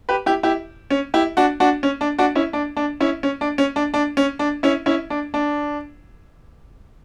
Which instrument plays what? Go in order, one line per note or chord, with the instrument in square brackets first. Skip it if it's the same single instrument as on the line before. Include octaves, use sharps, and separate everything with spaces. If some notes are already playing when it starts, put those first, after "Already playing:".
[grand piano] G4 B4
E4 G4
E4 G4
C#4
E4 G4
D4 F#4
D4 F#4
C#4
D4
D4 F#4
C#4 E4
D4
D4
C#4 E4
C#4
D4
C#4
D4
D4
C#4
D4
C#4 E4
C#4 E4
D4
D4